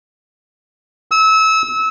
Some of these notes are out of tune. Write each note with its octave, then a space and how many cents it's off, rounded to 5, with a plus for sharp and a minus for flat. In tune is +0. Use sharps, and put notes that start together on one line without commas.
E6 -25